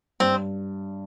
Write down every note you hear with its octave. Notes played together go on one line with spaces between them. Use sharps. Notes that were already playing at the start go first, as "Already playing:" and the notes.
G2 C4